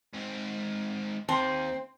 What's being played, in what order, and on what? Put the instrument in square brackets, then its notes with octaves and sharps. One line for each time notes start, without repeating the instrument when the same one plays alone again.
[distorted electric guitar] G#2 C4
[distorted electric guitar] D#2 [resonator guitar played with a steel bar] C4 [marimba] A5 C6